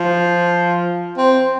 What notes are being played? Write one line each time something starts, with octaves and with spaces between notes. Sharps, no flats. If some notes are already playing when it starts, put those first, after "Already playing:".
Already playing: F3
C4